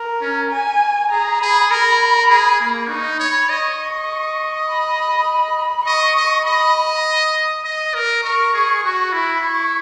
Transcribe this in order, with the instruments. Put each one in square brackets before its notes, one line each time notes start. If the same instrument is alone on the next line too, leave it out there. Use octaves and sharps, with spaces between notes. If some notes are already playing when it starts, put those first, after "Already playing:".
Already playing: [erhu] A#4
[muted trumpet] C#4
[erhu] G#5
[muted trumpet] G#4 [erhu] A#5
[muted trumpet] G#4 [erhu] B5
[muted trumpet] A#4
G#4
A#3
[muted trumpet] D#4 [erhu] C#6
[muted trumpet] C#5 [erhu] B5
[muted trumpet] D#5 [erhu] C#6
[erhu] B5
B5
B5
[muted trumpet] D#5 [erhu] C#6
[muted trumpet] D#5
[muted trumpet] D#5 [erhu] B5
[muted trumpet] D#5
A#4
[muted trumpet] A#4 [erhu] C#6
[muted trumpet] G#4
[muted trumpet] F#4 [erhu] C#6
[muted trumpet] E4 [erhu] B5
[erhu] C#6